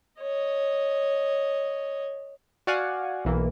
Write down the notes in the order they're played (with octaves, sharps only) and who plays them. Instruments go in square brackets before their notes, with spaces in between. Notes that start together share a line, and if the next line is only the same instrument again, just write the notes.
[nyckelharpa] C#5 D#5
[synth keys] F#4 D5 F5 F#5 G#5
B1 E3 A#3